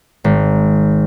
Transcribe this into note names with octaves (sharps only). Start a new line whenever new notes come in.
G#1